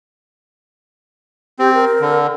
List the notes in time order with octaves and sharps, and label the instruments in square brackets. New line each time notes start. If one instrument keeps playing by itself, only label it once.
[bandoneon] C4 [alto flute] G4
[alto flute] A#4
[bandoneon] D3